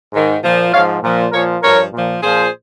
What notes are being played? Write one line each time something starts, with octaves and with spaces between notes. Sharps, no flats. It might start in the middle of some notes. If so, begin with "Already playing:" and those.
G#2 D#3
A#2 F3
G#2 F3 C#5 F5
A#2 F3
A#2 F3 A#4 C#5
G2 F3 A#4 C#5
A#2 F3
A#2 F3 G#4 C5